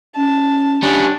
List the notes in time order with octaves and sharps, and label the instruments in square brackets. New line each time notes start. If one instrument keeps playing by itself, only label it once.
[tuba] C#4 [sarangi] A5
[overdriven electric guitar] G3 C#4 [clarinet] D4